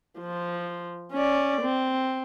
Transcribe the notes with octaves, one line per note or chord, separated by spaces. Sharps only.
F3
C#4 D5
C4